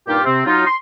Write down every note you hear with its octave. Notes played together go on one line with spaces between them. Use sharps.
G2 A#2 D#4 F4 G4
C3 C4
F#3 D#4 F4
C6